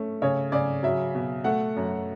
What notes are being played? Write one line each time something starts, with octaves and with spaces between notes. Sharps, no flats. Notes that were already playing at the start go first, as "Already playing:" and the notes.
Already playing: A3 C#4
C#3 C#5
C#3 D5
F#3 E5
B2
A3 F#5
F#2